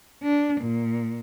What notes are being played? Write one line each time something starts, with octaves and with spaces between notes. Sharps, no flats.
D4
A#2